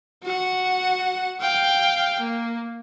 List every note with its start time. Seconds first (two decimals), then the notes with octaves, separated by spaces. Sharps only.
0.23 F#4 F#5
1.41 F5 G5
2.20 A#3